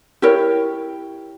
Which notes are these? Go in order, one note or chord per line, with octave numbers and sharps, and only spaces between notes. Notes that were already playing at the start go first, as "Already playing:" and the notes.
E4 G4 A#4 C#5